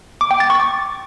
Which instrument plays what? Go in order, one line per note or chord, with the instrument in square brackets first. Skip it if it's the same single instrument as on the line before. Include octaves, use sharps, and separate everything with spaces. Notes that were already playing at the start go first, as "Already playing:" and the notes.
[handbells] D6
G5
A6
C#6
D6